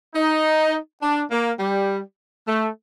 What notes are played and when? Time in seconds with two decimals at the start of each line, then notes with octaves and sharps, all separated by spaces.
0.14 D#4
1.02 D4
1.31 A#3
1.59 G3
2.47 A3